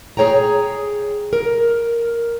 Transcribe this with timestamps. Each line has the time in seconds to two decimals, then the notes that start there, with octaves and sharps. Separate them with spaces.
0.17 G#4 A4 C#5 G5 A#5
1.33 A#4